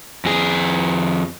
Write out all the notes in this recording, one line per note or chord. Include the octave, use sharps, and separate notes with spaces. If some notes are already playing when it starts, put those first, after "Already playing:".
F2 G#4